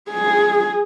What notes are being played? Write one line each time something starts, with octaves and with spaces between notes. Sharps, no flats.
G#4